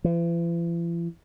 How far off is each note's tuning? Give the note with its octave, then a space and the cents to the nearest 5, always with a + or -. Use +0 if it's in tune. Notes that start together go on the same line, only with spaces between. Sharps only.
E3 +45